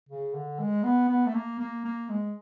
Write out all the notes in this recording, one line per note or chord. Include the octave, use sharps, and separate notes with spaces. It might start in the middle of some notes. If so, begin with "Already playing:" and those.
C#3
D3
G#3
B3
B3
A3
A#3
A#3
A#3
G#3